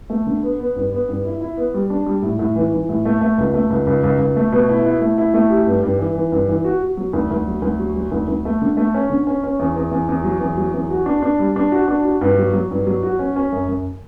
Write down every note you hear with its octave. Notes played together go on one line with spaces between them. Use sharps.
A3
D3
B3
B3
G2
B3
G2
E4
E4
B3
G3
D4
G3
A2
A2
E3
E3
A2
A3
A3
C#2
A3
C#2
C#2
C#2
C#2
A3
B2
E4
E4
A3
E4
A3
G4
G2
G2
E3
E3
G2
E3
F#4
F#4
F#3
D2
D2
F#3
D2
F#3
F#3
D2
D2
A3
D3
A3
C#4
D3
C#4
C#4
E2
E2
E2
E2
F#3
E2
F#3
E2
F#4
D4
D4
G3
D4
F#4
D4
F#4
G2
F#3
F#3
G2
F#3
F#4
C#4
C#4
F#2
F#2